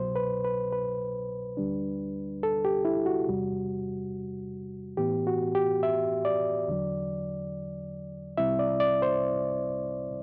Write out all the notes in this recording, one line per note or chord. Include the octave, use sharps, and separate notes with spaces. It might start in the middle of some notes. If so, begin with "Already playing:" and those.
Already playing: C2 B2 F#3 C5
B4
B4
B4
D2 D3 G3 D4
A4
G4
E4
F#4
E2 C3 G3
A2 E3 B3 G4
F#4
G4
E5
D5
E2 D3 F#3
C2 C3 G3 C4 E4 E5
D5
D5
C5